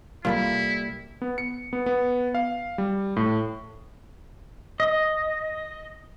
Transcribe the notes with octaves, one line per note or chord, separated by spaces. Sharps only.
C2 G3 A#3 E4 F4 A4 B5 F6
B3
C#7
B3
B3
F5
G3
A2
D#5